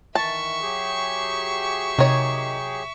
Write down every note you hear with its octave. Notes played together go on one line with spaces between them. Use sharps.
D#3 E3 E5 A5 C#6
F#3 G4 G#4
C3 D#3 C#5